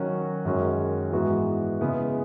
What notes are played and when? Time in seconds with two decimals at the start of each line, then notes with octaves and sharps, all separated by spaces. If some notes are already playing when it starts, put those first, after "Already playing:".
Already playing: D#3 F#3 C#4 F#4
0.45 F#2 D#3 G#3 C#4 F#4
1.12 G#2 E3 G#3 B3 F#4
1.81 C#3 G#3 B3 E4